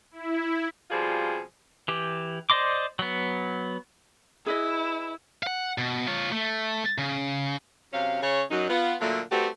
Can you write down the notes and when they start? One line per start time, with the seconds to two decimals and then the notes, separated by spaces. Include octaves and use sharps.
0.11 E4
0.91 B2 F3 G3 C4 F4 G#4
1.88 E3 G4
2.50 C5 D5 D#5 C6 D6
2.99 F#3 B3
4.46 E4 G#4 B4 D#5
5.43 F5 F#5
5.78 B2
6.08 F4 C#5
6.32 A3
6.98 C#3
7.93 F#2 C3 C#4 F5
8.22 C#3 C#5
8.50 F#2 F#3 D#4
8.69 B3 F4
9.00 A#2 D3 F#3 A3 A#3
9.31 G3 A3 B3 C4 F#4 G4